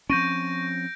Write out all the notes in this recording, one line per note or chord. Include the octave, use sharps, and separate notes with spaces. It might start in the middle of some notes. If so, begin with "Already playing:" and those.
F3 C4 C#4 C#6 G6 A#6 D7 D#7